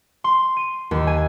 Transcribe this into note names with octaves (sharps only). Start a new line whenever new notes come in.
C6
D#7
D#2
G#5